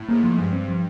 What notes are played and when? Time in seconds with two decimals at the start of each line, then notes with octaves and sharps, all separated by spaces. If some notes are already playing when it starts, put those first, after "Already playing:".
Already playing: A2
0.08 G#2 A#3
0.23 F3
0.38 G2 G#3
0.53 C4
0.68 F3